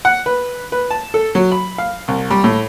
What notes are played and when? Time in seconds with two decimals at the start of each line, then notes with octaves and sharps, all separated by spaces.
0.05 F#5
0.26 B4
0.72 B4
0.91 A5
1.14 A4
1.35 F#3
1.52 B5
1.78 F5
2.08 C2
2.30 G3
2.44 A2